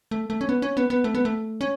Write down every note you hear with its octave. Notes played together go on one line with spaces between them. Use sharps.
A3
A3
C#4
B3
C#4
B3
B3
A3
B3
A3
C#4